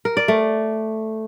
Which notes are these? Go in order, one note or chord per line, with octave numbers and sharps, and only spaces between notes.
A#4
D5
A3